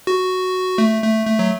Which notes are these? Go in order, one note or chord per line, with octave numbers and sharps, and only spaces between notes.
F#4
A3
A3
A3
F#3